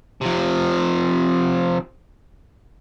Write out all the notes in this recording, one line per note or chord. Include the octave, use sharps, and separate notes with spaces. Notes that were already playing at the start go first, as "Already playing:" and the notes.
C3 F3